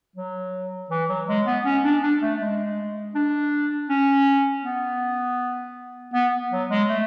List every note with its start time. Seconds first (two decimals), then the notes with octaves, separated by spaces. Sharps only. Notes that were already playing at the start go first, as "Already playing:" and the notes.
0.16 F#3
0.90 E3
1.09 F#3
1.28 G#3
1.46 B3
1.65 C#4
1.84 D4
2.03 D4
2.21 A3
2.40 G#3
3.15 D4
3.89 C#4
4.64 B3
6.14 B3
6.52 F#3
6.70 G#3
6.89 A3